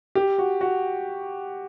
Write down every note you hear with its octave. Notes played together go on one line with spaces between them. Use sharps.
G4
F#4
F#4